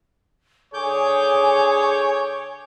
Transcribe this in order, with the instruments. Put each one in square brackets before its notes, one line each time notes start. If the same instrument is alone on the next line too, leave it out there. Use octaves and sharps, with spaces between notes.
[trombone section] D3 G#4 [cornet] C#5 [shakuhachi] G#5 [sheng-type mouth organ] D6 G6